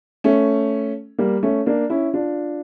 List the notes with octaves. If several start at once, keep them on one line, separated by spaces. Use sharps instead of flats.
A3 C#4
G3 A#3
A3 C#4
A#3 D4
C#4 E4
D4 F4